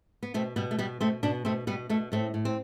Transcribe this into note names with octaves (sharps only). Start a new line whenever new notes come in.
B3
B2 A3 C4
B2 G3 B3
A3
B2 G3 B3
B2 A3 C4
B2 B3 D4
B2 A3 C4
B2 G3 B3
B2 A3
A2 A3 C4
A2
C4